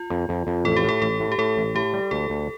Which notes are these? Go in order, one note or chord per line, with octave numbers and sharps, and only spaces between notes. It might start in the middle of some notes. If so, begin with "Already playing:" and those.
Already playing: F4
F2
F2
F2
A1 A4
G4
A2 A4
A1 A4
A2
G4
A2 A4
A1
A2 G4
G3
D2 A4
D2